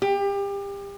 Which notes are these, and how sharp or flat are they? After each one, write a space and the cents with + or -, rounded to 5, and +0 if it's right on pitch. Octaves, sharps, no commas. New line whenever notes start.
G4 +30